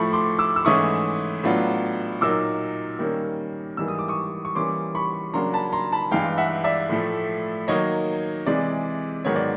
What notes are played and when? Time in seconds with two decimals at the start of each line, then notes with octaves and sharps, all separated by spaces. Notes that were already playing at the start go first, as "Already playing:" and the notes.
Already playing: A2 F3 A3 B5 C#6
0.13 C6 D6
0.39 D6 E6
0.56 E6
0.65 G#2 E3 A3 C#4 E4 C#6 D#6
1.44 A2 F#3 B3 D4 F4
2.21 A#2 F#3 A#3 D#4 D6 E6
2.99 D#3 G3 A#3 C#4
3.77 G#2 E3 G3 A#3 E6
3.88 D#6
3.99 D6
4.08 C#6 D#6
4.45 C#6
4.55 E3 G3 A#3 C#4 C6 D6
4.95 B5 C#6
5.33 C#3 F#3 A#3 D4 A#5 C6
5.53 A5 B5
5.73 A#5 C6
5.92 A5 B5
6.11 G2 E3 G#3 F5 G5
6.38 E5 F#5
6.64 D5 E5
6.90 A2 F3 A3
7.68 D#3 F#3 A#3 C#5 D#5
8.46 C3 E3 G#3 D5
9.25 G#2 D#3 F#3 B3 C#5
9.36 D5